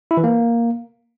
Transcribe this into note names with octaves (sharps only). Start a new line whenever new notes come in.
E4
E3
A#3